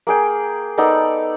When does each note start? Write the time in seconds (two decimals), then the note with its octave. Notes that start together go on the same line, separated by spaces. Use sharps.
0.07 A#3 G#4 G5
0.78 B3 D#4 A4 D5